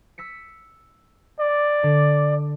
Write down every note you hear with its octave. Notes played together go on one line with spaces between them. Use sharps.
E6 B6 C#7
D5
D3